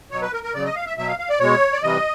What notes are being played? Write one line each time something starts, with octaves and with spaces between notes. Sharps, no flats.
B2 F#3 C#5
B4
A#4
A#4
C#3 F#3 D5
D#5
F5
E5
B2 F#3 E5
F5
F5
D5
B2 G#3 C#5
D5
C3 E3 G3 D#5